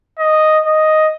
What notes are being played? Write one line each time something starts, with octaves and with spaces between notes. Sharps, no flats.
D#5
D#5